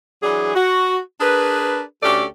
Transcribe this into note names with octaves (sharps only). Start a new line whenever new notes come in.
E3 F#3 D4 G#4
F#4
D4 G#4 A#4 B4
D2 A3 C#4 G4 A4 D5